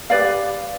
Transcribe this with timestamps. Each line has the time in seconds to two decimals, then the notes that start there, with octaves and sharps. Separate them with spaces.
0.10 G4 B4 D5 F5